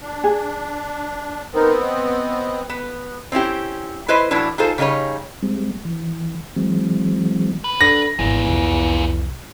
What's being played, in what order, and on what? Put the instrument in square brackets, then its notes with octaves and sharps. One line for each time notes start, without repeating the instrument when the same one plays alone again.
[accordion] D4
[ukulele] G#4
[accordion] B3 C4 [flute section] D#4 A#4
[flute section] D#5
[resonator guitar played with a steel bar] B3
C4 C#4 E4 G4
E4 B4 C5 D#5 E5
A2 E3 F#3 D4 E4
D#4 F4 G#4 A4 C5
C#3 G3 D#4 G#4 C#5
[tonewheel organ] G3 G#3 C4
E3
E3 F#3 G#3 C4
[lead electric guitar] B4
[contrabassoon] D3 [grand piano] A#6
[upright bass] G#1 [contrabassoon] E2 [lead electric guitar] F4 G#4
[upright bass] C2 F2